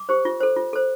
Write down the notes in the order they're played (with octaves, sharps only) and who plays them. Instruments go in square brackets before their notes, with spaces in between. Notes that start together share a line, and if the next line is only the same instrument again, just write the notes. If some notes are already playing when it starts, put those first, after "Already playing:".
Already playing: [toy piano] D6
G4 C5
F4
A4 C5
F4
A4 C5